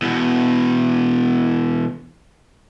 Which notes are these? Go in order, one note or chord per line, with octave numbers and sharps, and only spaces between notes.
E2 B2